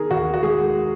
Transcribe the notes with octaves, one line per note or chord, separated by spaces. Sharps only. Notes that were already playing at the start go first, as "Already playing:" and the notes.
Already playing: D#3 B3 G#4 A#4
D#2 F#4
F#4
G#3 G#4